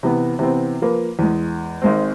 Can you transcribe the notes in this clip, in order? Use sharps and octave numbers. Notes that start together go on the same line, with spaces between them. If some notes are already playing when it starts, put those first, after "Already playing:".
C3 E3 B3
C3 E3 B3 C4
F3 A#3 B4
E2 G#3
G#1 G#3 C4